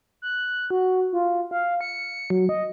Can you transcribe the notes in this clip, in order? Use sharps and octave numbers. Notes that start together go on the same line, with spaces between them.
F#6
F#4
F4
F5
C#7
F#3
D#5